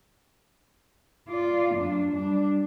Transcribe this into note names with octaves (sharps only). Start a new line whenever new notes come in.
F4 D5
F#2 D4
G3 D4